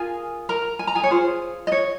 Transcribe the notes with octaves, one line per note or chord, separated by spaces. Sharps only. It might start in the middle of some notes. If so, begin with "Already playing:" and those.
Already playing: F4 G#4 A#4 G#5
A#4 A#5
G#5
A#5
G#4 G#5
C#5
F4 G#4 C5
D#5
C#5